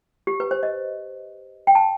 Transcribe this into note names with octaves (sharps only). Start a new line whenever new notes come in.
G4
B4
C5
D#5
G5
A5